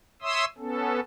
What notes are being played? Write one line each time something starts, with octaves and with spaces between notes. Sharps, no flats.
C#5 E5 C6 D#6 E6
B3 C#4 A4